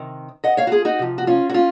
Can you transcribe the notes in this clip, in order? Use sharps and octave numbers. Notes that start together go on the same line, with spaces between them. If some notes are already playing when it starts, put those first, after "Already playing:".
Already playing: C3 D#3
D#5 F#5
C#5 F5
F#4
F4 G#4
D#4 F#4
C3 F3
F#4
C#4 F4
F#4
C#4 F4